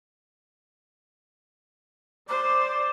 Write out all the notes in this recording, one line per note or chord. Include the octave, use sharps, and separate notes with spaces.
C5 D5 D6